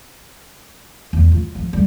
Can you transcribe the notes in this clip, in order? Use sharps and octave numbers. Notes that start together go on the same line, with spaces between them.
E2
F4
F3
G3